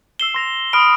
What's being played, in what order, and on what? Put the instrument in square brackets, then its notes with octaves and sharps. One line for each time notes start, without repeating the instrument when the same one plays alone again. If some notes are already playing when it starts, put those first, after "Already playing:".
[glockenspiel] E6 C7 E7 [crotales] G7
[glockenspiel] C6 A#6 F7
[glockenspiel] B5 [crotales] D#6 F6 D7